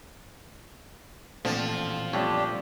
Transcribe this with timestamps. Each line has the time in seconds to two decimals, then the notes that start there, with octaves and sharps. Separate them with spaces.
1.45 A1 A#2 D3 F3 C4
2.13 G1 F2 D4 G4 C#5